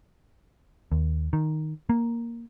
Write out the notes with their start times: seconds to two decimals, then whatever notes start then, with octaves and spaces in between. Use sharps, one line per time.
0.92 D#2
1.33 D#3
1.89 A#3